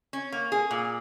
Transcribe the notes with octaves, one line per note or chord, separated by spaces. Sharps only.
C#4
A#3
G#4
A#2